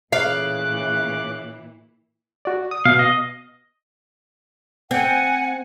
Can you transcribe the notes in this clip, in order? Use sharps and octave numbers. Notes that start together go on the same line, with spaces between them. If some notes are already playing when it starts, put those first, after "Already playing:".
A#2 C#3 E3 F5 D6 F#6
F#4 D5
D#6
B2 F5
D#5
C4 F#5 G#5